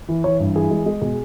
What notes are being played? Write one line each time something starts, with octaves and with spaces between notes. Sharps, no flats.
E3
E3 C#5
G2
E3 G#4
G#3
G#3
B2 G#4